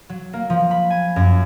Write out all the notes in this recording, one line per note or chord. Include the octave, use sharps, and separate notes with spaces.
F#3
A#3
F3
B5
G#5
F#2